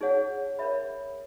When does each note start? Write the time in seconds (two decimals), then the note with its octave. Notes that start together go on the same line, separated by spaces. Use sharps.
0.01 D#4 G#4 C#5 F#5
0.59 A#4 C#5 E5 B5